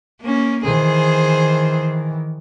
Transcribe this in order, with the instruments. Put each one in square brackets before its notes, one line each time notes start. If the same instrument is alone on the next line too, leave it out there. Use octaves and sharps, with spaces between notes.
[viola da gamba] A#3 C#4
[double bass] D#3 E3 [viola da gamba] G#4 C5